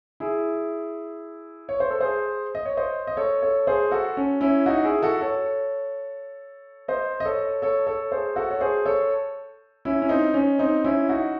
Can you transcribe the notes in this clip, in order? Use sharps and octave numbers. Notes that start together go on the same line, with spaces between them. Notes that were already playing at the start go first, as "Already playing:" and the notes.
E4 G#4
C#5
C5
A4
G#4 C5
D#5
C#5
C5 D#5
D#5
A4 C#5
A4 C#5
G#4 C5
F#4 A4
C#4
C#4 E4
D#4 F#4
E4 G#4
F#4 A4
A4 C#5
C5 D#5
D#5
A4 C#5
A4 C#5
A4 C#5
G#4 C5
F#4 A4
C#5
G#4 C5
A4 C#5
C#4 E4
C#4
C4 D#4
C#4
C4 D#4
C#4 E4
D#4 F#4